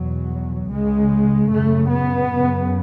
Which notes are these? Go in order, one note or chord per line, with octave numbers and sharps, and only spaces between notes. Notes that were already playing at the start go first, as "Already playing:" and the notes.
Already playing: E2 B2 F#3
C#2 C#3 G#3
F#2 C#3 A3
B3
F#2 C#3